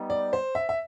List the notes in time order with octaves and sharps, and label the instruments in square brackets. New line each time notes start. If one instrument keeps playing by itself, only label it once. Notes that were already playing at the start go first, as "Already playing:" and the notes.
Already playing: [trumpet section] G3 B3 D#4
[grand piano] D5
C5
E5
E5